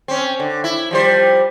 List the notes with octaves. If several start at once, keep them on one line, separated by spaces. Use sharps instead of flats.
C4 C#4
D3
E4
F3 G3 C5